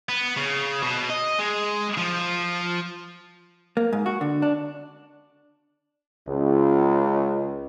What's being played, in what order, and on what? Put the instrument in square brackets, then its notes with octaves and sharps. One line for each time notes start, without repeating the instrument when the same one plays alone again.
[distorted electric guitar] B3
C#3
B2
D#5
G#3
F3
[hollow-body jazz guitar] A#3
G#2
F#4
D3
D4
[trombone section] C#2